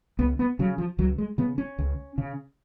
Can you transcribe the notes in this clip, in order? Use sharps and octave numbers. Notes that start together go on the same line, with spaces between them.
C#2 B3
B3
C#3 F#3
F3
C#2 F#3
G#3
C#3 B3
C#4
C#2
C#3